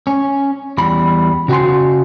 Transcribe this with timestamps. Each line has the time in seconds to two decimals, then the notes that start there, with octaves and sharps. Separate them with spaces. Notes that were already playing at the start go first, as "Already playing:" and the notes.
0.07 C#4
0.78 E2 G3 B5
1.48 C#3 F#4 C5 G#5 C6